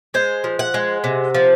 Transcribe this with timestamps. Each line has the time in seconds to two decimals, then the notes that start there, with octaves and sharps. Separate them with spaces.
0.14 G#3 C5
0.44 F3
0.59 F#5
0.74 G#3
1.04 C3
1.35 F3